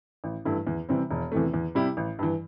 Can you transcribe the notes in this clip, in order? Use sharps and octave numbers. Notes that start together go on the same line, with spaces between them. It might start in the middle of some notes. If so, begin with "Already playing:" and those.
A1
G2 E3 A3 E4
E2
C3 E3 G3 C4
E1
E2 C3 E3 A3
E2
C3 G3 E4 G4
A1
G2 E3